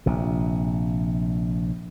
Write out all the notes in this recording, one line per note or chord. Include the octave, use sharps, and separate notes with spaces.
A#1 C3